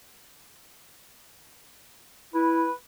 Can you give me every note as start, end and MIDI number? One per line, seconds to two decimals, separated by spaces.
2.34 2.67 64
2.34 2.72 71